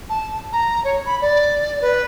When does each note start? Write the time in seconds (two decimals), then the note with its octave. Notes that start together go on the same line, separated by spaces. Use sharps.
0.09 A5
0.52 A#5
0.84 C#5
1.05 B5
1.21 D5
1.81 B4